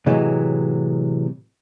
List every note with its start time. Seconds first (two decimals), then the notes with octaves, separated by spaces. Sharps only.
0.06 A2 C3 E3 F#3 G#3